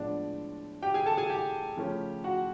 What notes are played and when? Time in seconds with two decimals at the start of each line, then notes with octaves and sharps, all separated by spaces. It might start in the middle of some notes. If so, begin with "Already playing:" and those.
Already playing: A2 F3 G#3 B3 D4 D5
0.82 G4 G5
0.94 G#4 G#5
1.06 A4 A5
1.17 G#4 G#5
1.30 G4 G5
1.77 C#3 F3 A3 C#4
2.24 F#4 F#5